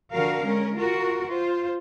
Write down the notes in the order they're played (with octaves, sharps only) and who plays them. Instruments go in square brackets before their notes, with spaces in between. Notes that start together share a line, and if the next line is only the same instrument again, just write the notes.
[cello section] D3 F3 F#4 A#4 F5
G#3 C#4 A#4
F4 F#4 A#4
F4 C5